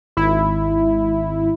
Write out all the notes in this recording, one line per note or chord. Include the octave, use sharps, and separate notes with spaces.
G#1 E4